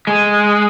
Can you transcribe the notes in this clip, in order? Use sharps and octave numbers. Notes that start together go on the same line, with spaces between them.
G#3